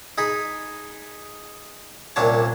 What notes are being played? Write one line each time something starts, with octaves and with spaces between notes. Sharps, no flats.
D#4 G#4 B5
C2 A#2 C#4 D4 C#5 A5